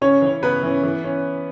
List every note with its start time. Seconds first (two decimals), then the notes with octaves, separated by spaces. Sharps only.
0.01 C#3 C#4 C#5
0.22 E3 C#4
0.43 C#3 B3 B4
0.63 E3 C#4
0.84 E3
1.04 C#4